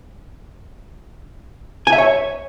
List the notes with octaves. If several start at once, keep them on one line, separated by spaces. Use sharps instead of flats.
G#5
E5
C#5